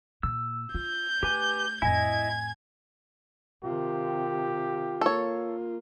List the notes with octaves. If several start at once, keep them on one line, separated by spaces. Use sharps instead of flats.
A#2 E6
F4 G6
A3 G4 B4 G#5
F2 A2 E4 D#5 G#5 G#6
C3 D#3 F4 G4
A#3 A4 C#5